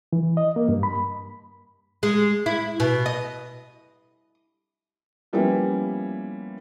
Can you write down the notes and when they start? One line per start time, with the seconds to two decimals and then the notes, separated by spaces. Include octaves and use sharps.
0.13 E3
0.37 D#5
0.56 A#3
0.69 G2
0.83 B5
2.03 G#3
2.46 E4
2.80 B2
3.06 D#5
5.33 F3 G3 A#3 B3 C#4 E4